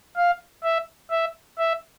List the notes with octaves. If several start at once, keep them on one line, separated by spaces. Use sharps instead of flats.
F5
E5
E5
E5